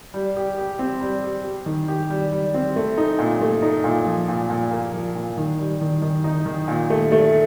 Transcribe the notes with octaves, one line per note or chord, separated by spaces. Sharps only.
G3
G4
G4
C4
G3
G4
G4
D#3
G4
G3
G3
C4
A3
D#4
A#2
A3
D#4
A#2
F3
A#2
A#2
A#3
F3
A#2
D#3
G3
D#3
D#3
D#4
D#3
A#2
A3
A3